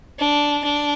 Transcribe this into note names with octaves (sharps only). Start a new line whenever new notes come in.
D4
D4